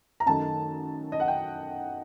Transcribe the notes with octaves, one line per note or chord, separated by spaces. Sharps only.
A#5
F#2 D#3 A3 A5
D#5
F#5
G5